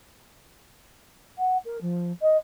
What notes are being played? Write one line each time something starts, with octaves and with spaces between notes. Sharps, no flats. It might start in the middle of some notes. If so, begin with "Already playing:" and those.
F#5
A#4
F3
D#5